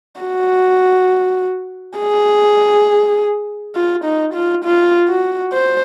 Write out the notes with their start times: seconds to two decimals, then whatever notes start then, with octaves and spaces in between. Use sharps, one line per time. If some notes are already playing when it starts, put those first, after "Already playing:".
0.21 F#4
1.99 G#4
3.75 F4
4.04 D#4
4.34 F4
4.65 F4
5.09 F#4
5.53 C5